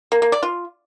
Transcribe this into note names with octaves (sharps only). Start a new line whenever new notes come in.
A#3
A#3
D5
F4